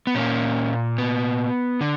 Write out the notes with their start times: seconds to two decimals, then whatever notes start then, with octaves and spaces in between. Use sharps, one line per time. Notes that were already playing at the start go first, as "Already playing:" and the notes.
0.07 B3
0.15 A#2 A#3 C#4
0.98 B3
1.81 D3